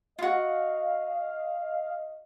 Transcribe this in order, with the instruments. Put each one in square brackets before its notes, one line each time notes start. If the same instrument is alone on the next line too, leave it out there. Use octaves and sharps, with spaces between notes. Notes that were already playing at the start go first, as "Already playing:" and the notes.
[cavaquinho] F4 F#4 [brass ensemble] D#5 [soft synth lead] F5